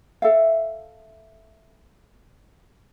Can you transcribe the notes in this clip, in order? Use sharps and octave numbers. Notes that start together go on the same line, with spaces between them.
A4 E5 F5